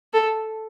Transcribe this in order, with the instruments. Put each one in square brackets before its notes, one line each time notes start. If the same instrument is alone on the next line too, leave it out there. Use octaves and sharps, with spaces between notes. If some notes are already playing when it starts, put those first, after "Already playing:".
[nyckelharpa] A4